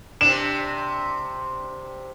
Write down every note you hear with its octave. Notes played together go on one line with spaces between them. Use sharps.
C3 D4 E7